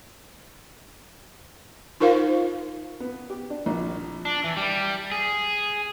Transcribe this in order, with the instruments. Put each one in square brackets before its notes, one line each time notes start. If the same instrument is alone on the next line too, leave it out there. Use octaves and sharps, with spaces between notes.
[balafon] D#4 F4 A#4 C5 F5
[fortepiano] B3
G4
D4
A#1
[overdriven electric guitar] D4
E3
G3
G#4